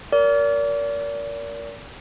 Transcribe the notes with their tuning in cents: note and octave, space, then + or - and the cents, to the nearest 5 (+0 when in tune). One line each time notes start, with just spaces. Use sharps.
A#4 +0 D5 -40